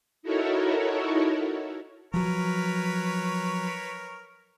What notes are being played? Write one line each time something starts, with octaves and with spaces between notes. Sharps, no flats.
D#4 E4 F#4 A4 A#4 C#5
F3 F#3 A#4 B4 C#5